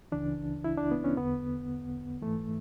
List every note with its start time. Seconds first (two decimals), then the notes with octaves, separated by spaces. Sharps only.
0.12 C#2 C#3 E3 D4
0.64 E4
0.77 D4
0.91 B3
1.04 C#4
1.17 E2 D3 B3
2.22 G#2 E3 A3